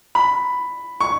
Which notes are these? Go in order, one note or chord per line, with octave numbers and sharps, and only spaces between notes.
B5
C#6